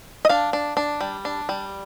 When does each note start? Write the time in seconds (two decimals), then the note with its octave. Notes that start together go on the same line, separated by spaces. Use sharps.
0.25 D#5
0.29 D4 F5
0.53 D4
0.77 D4
1.01 G3
1.25 D4
1.49 G3